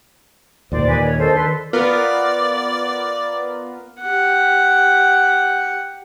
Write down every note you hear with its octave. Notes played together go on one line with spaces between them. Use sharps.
D#2 A#2 C5 D5
D#3 D#4 B4 D5 G#5
A#4 C#5 D5 F6
D4 F#4 A4 A#4 C5 D#5
A4 B4 C6
B3 F4 A#4 D5
G4 F#5